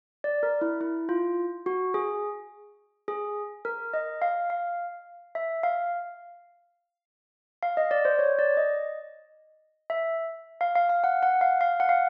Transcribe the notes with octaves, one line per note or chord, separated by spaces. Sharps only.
D5
A#4
E4
E4
F4
F#4
G#4
G#4
A#4
D#5
F5
F5
E5
F5
F5
D#5
D5
C5
C#5
D5
D#5
E5
F5
F5
F5
F#5
F#5
F5
F5
F#5
F5